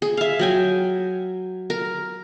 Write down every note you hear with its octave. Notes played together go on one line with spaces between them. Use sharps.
G#4
E5 F5
F#3 G5 G#5
A#4